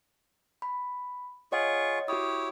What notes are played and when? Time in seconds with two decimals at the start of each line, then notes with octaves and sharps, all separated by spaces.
0.62 B5
1.52 F4 G#4 C#5 D#5 F#5 C#6
2.08 E4 F#4 G4 C#5 D#6